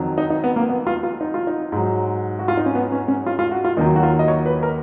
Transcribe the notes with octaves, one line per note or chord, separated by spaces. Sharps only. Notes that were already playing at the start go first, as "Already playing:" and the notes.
Already playing: F2 D#3 F#3
D#4
D#4
B3
A#3
B3
F4
F4
D#4
F4
D#4
G#2 F#3
F#4
F4
D#4
C#4
B3
C#4
C#4
F4
F4
F#4
F4
D#2 D#3 F#3 D#4
F#4
F4
D#5
C#5
B4
A#4